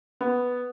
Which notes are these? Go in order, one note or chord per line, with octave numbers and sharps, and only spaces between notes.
B3